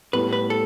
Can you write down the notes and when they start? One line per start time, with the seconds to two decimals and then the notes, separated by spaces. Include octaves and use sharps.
0.13 A2 G3 B3 B4
0.33 B4
0.50 A4